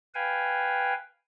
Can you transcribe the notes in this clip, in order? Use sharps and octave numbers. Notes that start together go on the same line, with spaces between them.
B4 F5 G5 G#5